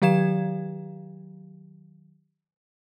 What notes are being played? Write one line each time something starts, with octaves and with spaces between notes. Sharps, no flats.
D#3 F#3 G4 F5 G#6 E7